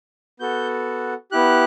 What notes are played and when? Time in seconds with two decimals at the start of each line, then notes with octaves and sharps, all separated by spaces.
0.40 B3 F#4 A4 G6
1.32 B3 E4 G4 F#6